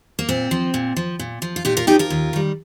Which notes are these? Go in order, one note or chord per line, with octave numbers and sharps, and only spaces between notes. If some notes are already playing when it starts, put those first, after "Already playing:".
A#3
A#2 C4
F3
A#2
F3
A#2
F3
F4
A#2 D#4 G4
F4 A#4
F3 D#4 G4
F4 A#4
D#2
D#3 G3